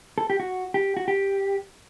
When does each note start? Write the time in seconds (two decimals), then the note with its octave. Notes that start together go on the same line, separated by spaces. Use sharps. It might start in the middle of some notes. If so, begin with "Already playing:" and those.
0.18 A4
0.30 G4
0.40 F#4
0.74 G4
0.97 F#4
1.08 G4